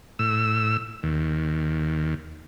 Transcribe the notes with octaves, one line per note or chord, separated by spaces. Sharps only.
A2 E6
D#2